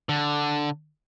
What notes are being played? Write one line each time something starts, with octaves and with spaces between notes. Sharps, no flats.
D3